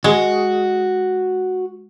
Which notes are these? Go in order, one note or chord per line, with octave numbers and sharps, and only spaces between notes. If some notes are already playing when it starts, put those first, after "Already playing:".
G#3 F#4